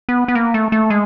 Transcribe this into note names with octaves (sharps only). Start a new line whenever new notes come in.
B3
B3
A#3
A3
A3
G#3